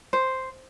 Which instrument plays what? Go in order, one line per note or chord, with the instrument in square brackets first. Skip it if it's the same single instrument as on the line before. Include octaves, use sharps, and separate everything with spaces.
[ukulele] C5